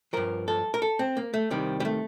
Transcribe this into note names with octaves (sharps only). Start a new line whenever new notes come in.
G2 F3 A#4
A4
A#4
A4
C4
A#3
A3
C2 C3 D#3 G3
G3
A3